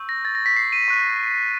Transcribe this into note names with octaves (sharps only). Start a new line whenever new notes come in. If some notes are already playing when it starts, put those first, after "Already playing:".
Already playing: C#6 E6 G6
A#6
A6
A#6
B6
C7
D#7
C#6 F#6